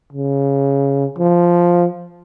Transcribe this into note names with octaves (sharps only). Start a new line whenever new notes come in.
C#3
F3